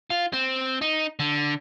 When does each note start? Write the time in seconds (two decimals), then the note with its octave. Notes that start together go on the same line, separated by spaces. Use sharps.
0.10 F4
0.33 C4
0.81 D#4
1.19 D3